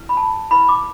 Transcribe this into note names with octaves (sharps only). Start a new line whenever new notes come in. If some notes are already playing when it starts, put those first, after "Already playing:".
Already playing: E4 B4
B5
A5
E4 B4 B5
D6